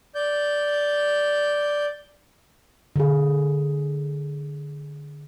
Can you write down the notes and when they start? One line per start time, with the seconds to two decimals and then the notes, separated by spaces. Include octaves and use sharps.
0.15 D5 G6
2.96 D3 G#4